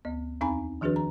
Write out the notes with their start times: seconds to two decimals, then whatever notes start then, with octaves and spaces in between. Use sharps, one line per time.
0.05 D2 B3
0.41 E2 C4 D#4 G#5 A#5 B5
0.81 D#3 F3 D4 F#4 G#4 B4
0.96 A#5